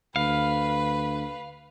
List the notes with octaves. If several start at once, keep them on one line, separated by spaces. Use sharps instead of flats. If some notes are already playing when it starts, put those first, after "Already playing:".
D2 B4 F5